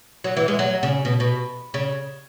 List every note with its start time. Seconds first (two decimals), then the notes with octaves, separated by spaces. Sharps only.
0.24 F#3
0.37 E3
0.48 G#3
0.59 F#3
0.83 C#3
1.05 B2
1.20 B2
1.74 C#3